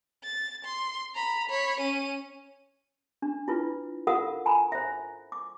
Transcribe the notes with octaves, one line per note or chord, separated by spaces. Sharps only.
A6
C6
A#5 B5
C#5 B5
C#4 D#7
D4
E4 F4 B4
F4 A4 A#4 F5 F#5 D#6
G#5 A#5 B5
C5 E5
D6